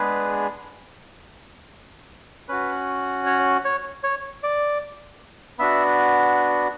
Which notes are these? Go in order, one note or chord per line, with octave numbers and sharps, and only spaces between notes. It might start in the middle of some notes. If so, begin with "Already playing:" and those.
Already playing: G#3 B3 D4 G#4 B4
C#4 F#4 B4
C#5
C#5
C#5
D5
B3 D4 F#4 E5